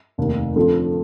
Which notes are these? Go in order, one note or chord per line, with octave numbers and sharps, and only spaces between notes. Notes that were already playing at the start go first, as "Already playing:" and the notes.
F1 D#2 D#3
F2 D3 F3